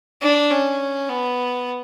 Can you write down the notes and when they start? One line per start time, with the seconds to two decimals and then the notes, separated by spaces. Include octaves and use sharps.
0.22 D4
0.51 C#4
1.09 B3